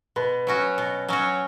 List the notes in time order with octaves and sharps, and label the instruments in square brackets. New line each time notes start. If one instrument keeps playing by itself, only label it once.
[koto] B2 [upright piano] B4
[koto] F#3 C#4 F#4
B2
F#3 C#4 F#4